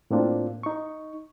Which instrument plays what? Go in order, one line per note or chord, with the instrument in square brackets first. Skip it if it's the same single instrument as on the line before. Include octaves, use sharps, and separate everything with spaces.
[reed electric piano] A2 A#3 C4 D4 F4
D#4 C#6